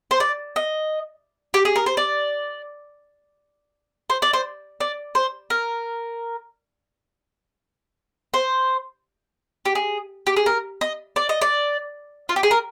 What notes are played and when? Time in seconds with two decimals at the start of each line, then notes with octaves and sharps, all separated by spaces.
0.11 C5
0.20 D5
0.56 D#5
1.54 G4
1.65 G#4
1.76 A#4
1.86 C5
1.97 D5
4.10 C5
4.22 D5
4.33 C5
4.80 D5
5.15 C5
5.50 A#4
8.34 C5
9.65 G4
9.75 G#4
10.27 G4
10.36 G#4
10.46 A#4
10.81 D#5
11.16 D5
11.29 D#5
11.41 D5
12.29 F4
12.36 G4
12.43 G#4
12.51 A#4